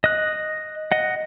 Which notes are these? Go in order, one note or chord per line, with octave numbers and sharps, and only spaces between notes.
D#5 F#6
D#5 F#5